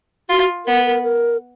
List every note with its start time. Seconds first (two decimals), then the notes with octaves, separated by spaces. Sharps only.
0.29 F4 F#4
0.66 B3 A#4
0.85 A#4
1.03 A#4